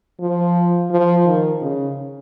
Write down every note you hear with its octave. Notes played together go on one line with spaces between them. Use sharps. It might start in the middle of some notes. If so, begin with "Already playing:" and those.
F3
F3
D#3
C#3